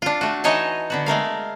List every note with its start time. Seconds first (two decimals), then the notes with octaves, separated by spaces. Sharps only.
0.02 D4 F4
0.21 A3 F#4
0.44 E3 D#4 C#5 D#5 G#5 A5
0.90 D3 B3 F#4
1.06 G#3 A3 A#4 F5